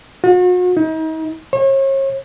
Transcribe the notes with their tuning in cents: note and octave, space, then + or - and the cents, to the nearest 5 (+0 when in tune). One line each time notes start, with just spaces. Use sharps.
F#4 -40
D#4 +40
C#5 -40